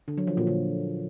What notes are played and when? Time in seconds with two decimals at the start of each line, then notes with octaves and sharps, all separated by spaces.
0.08 D3
0.18 F#3
0.27 F3
0.37 A#2
0.47 D3